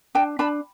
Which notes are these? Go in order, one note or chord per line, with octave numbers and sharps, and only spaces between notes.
D4 G5 A5
D4 A5 B5